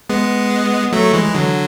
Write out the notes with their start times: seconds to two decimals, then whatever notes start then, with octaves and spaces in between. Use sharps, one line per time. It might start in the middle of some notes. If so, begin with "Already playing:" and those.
0.09 G#3 B3
0.92 F#3 A3
1.13 E3 G#3
1.25 E3
1.34 D3 F#3